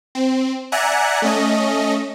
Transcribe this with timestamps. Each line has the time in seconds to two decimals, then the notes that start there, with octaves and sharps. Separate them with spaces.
0.15 C4
0.72 D5 E5 F#5 G#5 A#5 F#6
1.22 A3 C#4 D#5